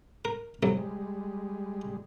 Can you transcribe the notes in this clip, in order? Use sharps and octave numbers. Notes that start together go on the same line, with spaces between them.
A#4
C2 F2 F#3
G3 G#3